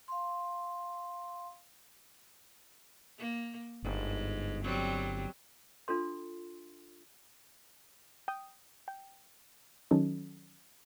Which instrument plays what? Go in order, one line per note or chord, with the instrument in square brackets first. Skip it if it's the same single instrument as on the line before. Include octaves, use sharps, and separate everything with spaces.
[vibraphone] F5 C6
[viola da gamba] A#3
[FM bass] G1 [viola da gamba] G#2
[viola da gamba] F#3 G3 C4
[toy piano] D4 F4 A4 C6
[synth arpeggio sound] G5 D#6
G5
D#3 F#3 C#4 D#4 A4